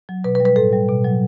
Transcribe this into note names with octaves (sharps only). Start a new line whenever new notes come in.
F#3
B2 B4
B4
G3
B4
A2 A4
G3
B2
F#3